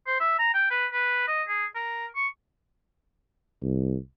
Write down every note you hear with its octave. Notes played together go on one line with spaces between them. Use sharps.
C5
E5
A#5
G5
B4
B4
D#5
G#4
A#4
C#6
C2